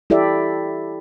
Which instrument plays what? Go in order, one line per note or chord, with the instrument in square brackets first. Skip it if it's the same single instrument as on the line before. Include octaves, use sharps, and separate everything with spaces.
[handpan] E4 G4 A4 D5 E5